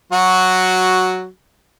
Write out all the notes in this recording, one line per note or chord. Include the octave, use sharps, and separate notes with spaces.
F#3 F#4